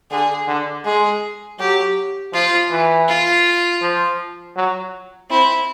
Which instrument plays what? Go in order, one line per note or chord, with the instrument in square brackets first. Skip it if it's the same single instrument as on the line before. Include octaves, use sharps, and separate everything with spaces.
[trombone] D3 [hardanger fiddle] G#4
[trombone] D3
[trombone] G#3 [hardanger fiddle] G#4
[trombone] F#3 [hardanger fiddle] G4
[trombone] F3 [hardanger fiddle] F4
[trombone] E3
[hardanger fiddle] F4
[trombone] F3
F#3
[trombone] C4 [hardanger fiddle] E4